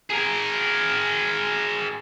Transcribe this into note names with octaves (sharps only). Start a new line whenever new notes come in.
G#4 A#4